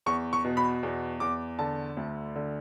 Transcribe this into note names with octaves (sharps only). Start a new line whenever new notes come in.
E2 C#6
C#6
B2
B5
E2
E2 D6
D3 A5
D2
D3